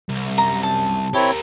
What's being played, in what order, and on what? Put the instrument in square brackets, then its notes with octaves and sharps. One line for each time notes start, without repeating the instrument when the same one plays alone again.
[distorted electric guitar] C2
[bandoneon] F#2 [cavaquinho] A#5
[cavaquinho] A5
[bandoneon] C4 E4 C#5 [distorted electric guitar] G4 A#4